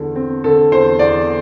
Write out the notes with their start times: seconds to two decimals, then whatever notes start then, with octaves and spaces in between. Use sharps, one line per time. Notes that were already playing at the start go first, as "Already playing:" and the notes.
Already playing: E2 D3
0.16 C4
0.44 D3 A4
0.72 E2 C5
0.99 E2 D5